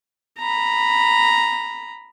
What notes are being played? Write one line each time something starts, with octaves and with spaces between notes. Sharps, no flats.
A#5 B5